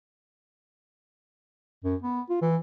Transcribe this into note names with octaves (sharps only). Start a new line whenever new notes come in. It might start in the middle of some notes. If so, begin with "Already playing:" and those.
F#2
B3
F4
E3